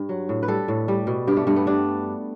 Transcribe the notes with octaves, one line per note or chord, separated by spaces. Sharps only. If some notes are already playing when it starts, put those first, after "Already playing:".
Already playing: G2
F#3
A2
B4
G3 A4
A2
G3
B2
G2 G4
A3
G2 A3
B3
G3 D4